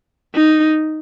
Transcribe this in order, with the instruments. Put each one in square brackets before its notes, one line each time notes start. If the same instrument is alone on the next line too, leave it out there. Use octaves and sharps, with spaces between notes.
[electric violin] D#4